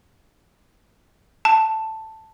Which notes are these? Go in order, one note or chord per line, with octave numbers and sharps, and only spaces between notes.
A5